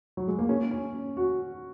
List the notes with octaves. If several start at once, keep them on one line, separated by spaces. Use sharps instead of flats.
F#3
G#3
A#3
C#4
C#4
F#4